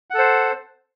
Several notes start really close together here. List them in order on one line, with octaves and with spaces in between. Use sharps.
F#5 A4 C5